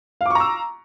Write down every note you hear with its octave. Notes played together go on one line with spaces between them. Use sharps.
F5 A#5 C#6 D6 E6